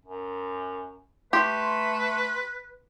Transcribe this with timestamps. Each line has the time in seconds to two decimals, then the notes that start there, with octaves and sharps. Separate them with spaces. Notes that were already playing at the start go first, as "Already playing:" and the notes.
0.06 F#2
1.33 A3 G4 B4 C6